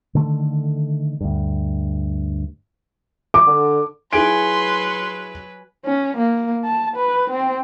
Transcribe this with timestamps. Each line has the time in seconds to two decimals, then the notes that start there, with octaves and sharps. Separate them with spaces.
0.15 D3 D#3 A3
1.21 D2 G2
3.34 D6
3.47 D3
4.13 F#3 E4 G#4 B4 G#5 C6 D7
5.85 C#4
6.17 A#3
6.65 A5
6.96 B4
7.30 C4